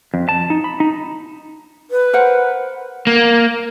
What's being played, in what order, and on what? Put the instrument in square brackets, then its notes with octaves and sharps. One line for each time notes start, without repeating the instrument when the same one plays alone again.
[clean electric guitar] F2
A5
D#4
B5
D#4
[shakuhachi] B4
[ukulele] A#4 C5 F#5
[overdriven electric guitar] A#3